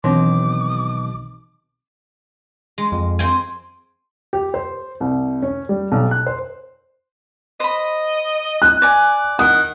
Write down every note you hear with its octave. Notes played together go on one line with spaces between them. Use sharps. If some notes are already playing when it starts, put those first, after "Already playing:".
B1 B2 D#3 E3 C4 D4 D6
G#3
F2
C4 G5 G#5
G4
C5
C2
C#4
G3
B1
F#6
C5
C5 D#5 B5
F#6
D5 G#5
D#3 F#5 D#6